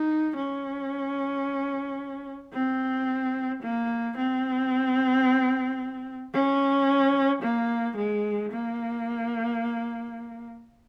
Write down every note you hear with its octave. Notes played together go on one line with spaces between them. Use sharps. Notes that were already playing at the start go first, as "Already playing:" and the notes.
Already playing: D#4
C#4
C4
A#3
C4
C#4
A#3
G#3
A#3